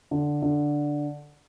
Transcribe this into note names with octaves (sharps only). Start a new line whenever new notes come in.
D3
D3